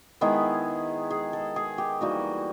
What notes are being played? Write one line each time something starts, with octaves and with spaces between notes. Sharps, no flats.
D#3 G#3 B3 E4 G#4
G#4
A4
G#4
G4
E3 G3 A#3 D#4 F#4